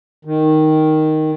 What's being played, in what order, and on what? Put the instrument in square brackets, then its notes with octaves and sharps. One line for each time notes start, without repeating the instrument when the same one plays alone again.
[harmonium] D#3